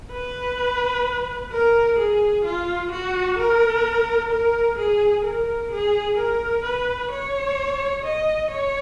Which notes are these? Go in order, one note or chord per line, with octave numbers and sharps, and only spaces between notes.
B4
A#4
G#4
F4
F#4
A#4
A#4
G#4
A#4
G#4
A#4
B4
C#5
D#5
C#5